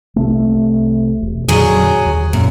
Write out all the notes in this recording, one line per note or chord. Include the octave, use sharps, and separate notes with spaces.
C2 C3 A3
E1
F2 A#2 D3 F#3 G#4
D#2
F#2 A#2 A#3